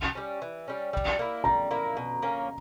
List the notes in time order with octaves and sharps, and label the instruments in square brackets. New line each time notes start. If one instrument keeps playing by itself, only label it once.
[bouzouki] G3 C#4
E3
G3 C#4
G3
A#3 E4
[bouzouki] G3 [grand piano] A#5
[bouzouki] A#3 E4
B2
A#3 C#4